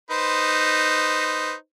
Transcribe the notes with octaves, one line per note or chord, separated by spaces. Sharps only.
D#4 B4 C5